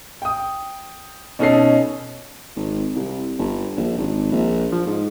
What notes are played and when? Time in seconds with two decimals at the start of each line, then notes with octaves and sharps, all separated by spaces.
0.22 G5 D#6
1.39 B2 C#4 D#4 A4 C7
2.56 G#1
2.95 C2
3.38 G1
3.77 A#1
3.98 G#1
4.32 A#1
4.72 F3
4.87 G#2